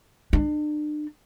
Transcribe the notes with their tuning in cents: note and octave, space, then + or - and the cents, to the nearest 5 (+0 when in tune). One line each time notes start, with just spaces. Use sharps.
D4 +40